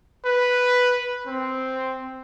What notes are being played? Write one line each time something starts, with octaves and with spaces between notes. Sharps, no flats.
B4
C4